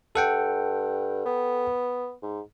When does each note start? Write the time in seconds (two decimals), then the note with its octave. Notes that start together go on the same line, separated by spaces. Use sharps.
0.15 G2 A4 F#5 G5
1.26 B3
2.23 G#2